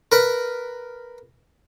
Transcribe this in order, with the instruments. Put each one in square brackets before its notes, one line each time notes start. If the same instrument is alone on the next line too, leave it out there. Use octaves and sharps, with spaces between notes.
[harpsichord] A#4 B4